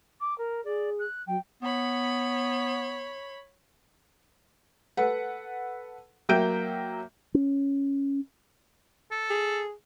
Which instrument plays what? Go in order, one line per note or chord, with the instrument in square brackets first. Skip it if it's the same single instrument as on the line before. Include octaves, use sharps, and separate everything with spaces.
[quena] D6
A#4
[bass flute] G#4 [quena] D5
[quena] F#6
[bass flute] F#3 [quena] G5
[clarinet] B3 [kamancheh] C#5 B5
[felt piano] A4 B4 F#5
F#3 A#3 E5 G5 G6 D7
[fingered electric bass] C#4
[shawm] A4
[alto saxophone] G#4